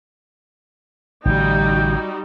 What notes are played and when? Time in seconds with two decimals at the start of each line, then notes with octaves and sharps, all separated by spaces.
1.25 A1 D3 G3 A3 D#4 F#4 G5